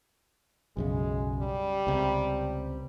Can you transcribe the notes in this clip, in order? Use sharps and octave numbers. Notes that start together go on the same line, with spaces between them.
B1 F#2 C#3 G#3
G3
C#2 C3